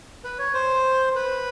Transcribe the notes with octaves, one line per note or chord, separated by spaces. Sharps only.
B4
C#5
C5
B4